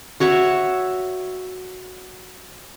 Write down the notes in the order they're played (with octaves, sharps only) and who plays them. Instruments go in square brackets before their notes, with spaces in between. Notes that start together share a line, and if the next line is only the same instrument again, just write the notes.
[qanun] F#4 C#5 E5 F#5